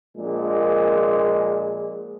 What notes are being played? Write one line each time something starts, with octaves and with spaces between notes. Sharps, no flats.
A#1 A#2 G#3